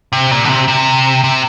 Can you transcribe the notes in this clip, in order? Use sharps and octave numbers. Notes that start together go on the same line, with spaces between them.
C3
A#2
D3
C3
C3
C3